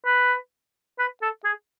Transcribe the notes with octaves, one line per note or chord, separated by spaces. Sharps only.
B4
B4
A4
G#4